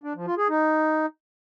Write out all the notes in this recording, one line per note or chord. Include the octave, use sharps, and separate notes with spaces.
D4
F3
F4
G#4
D#4